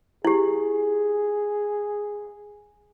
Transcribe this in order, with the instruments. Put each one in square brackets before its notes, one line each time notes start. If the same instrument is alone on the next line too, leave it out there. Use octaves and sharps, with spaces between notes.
[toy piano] E4 G4 [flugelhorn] G#4